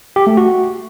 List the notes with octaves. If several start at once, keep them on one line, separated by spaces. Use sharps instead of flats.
G4
A3
F#4